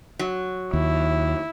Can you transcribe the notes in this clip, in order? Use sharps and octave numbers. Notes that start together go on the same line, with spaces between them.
F#3
D#2 E4